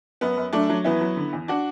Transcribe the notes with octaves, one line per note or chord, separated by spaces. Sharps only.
F#2 B3
F#2
F#3 A3 D4
F#3
E2 B3 E4
F#3
D3
E2
D4 F#4